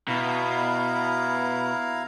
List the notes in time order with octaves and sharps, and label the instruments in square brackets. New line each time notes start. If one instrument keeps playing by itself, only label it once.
[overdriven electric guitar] B2 [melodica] E4 F5 A#5